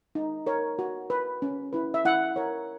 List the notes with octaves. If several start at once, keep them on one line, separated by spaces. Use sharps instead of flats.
D#4
A#4 C#5
F#4
B4
C#4
E4 B4
E5
E4 F#5
A#4 C#5